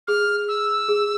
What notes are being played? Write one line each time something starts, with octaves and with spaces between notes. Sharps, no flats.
G#4 F6
E6
G#4